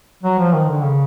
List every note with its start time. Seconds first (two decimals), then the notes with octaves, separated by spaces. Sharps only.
0.23 F#3
0.39 F3
0.54 D#3
0.69 D3
0.84 C#3